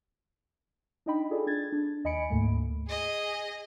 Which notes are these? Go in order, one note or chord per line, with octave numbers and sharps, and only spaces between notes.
D4 D#4 D#5 G5 B5
F4 G#4 A4 D5
D4 G#6 A6
D4
D#2 D#5 G#5 B5 C#7 D7
D2 G#2 A3 A#3
G#4 D#5